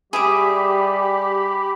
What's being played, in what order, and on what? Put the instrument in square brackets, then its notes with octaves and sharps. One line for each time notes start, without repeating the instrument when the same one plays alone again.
[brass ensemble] G3 [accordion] G4 [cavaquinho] G#4 E5 D6 [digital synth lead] B5